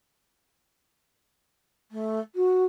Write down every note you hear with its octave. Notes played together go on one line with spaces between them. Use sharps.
A3
F#4